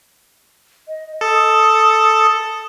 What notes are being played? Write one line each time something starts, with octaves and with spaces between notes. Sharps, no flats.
D#5
A4 D#6